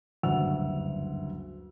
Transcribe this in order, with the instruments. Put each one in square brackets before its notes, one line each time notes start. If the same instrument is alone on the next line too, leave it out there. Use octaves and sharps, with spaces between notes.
[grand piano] F#1 D2 G2 F#5 E6 F7